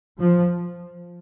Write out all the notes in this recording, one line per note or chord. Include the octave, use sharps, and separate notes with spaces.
F3